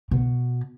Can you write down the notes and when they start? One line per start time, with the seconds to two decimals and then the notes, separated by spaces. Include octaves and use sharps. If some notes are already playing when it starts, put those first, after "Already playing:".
0.11 B2